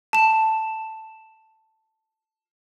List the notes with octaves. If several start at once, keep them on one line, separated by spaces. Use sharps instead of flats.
A5 E7